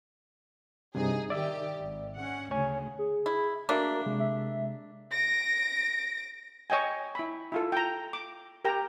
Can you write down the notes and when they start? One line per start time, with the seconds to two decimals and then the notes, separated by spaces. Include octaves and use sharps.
0.95 G2 C3 D#4 G#4
1.30 D#3 G4 D5 E5
1.82 G#1
2.16 C#4 F#5
2.51 D2 C#3 C#5 G#5
2.99 G#4
3.26 E4
3.69 A3 A#3 D4 F#4 A#4 E5 A#5
4.06 C3 G#3
4.19 E5
5.11 A#6 D7
6.70 C#5 D#5 G5 G#5
7.15 E4 B5
7.52 E4 F4 A4
7.72 G5 A#5
8.13 D6
8.65 G4 A#4 G5 A#5